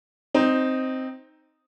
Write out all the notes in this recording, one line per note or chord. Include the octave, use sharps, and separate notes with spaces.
C4 D#4